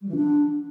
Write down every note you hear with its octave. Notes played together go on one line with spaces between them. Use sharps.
G3
E3
D4